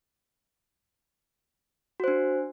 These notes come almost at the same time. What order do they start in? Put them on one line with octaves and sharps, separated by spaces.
F#4 C5 D4